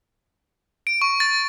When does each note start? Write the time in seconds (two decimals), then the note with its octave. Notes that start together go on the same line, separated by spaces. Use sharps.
0.87 D7
1.02 C#6
1.20 A6